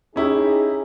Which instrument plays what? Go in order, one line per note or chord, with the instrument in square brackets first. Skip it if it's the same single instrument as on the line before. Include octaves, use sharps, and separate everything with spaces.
[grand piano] C#4 E4 G4 [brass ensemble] D#4 G#4